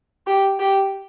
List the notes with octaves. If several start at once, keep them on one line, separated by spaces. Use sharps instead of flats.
G4
G4